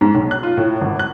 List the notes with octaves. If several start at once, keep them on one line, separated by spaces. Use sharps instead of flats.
G#2
B1
F#6
F4
A2
G#1
F#6